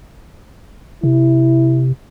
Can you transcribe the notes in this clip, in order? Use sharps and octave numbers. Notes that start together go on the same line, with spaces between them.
C3 E4